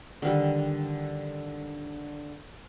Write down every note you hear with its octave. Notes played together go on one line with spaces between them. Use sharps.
D3 D#3 G3